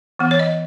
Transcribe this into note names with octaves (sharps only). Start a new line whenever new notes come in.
E3 B3
C#5
D#5